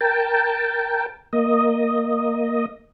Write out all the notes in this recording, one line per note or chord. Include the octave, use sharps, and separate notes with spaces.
A#4 G5 A5
A#3 D#5